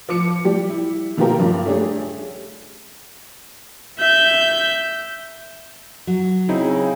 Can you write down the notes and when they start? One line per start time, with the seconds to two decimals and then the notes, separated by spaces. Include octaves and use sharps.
0.09 F3 D6 C#7
0.45 G3 G4
0.69 E4
1.17 B2 D#3 A#3 F4 G4 A#4
1.40 G2 C#3 F4
1.66 A3 C#4 D4 G4 G#4
3.99 E5 G6
6.07 F#3
6.49 C#3 C4 D#4 E4